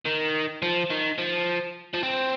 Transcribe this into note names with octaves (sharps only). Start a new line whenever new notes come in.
D#3
F3
D#3
F3
F3
C4